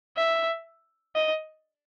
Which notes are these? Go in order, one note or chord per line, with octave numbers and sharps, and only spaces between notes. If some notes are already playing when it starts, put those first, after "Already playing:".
E5
D#5